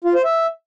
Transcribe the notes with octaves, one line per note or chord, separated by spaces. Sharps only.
F4
C5
E5